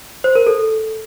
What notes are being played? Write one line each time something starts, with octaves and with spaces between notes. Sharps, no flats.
C5
A#4
A4